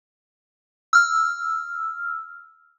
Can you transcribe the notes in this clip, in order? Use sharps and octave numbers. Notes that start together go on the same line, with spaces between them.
E6 F6